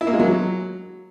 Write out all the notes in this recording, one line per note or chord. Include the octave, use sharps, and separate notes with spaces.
E4
A#3
G#3
F#3